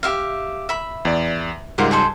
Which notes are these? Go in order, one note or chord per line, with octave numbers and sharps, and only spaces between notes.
G4 E5 F5
E5 B5
E2 D5
C#2 G#2 G3 F4 A#4 F#5
G#4 A4 C5